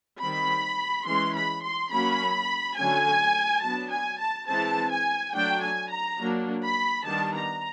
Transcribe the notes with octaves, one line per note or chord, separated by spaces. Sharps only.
D#3 G3 C4 B5
E3 G#3 C#4 C6
B5
C6
F#3 A#3 C#4 B5
D3 F#3 A3 C#4 G#5
F#3 B3 D4 A5
G#5
A5
E3 G#3 C4 A5
G#5
F#3 A3 D4 G5
G#5
A#5
F#3 A#3 D4
B5
D#3 G3 B3 D4 A5
A#5